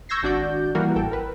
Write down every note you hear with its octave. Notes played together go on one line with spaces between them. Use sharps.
C#6 E6 G6 G#6 A#6 C7
G#1 D4 F#4 D5 G6
E3 G3 A#3 E4 F#4 A#4
A1 A4 G5
A#4 B4